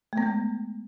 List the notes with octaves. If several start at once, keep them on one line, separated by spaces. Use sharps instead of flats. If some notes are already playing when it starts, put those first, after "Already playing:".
G#3 A3 B3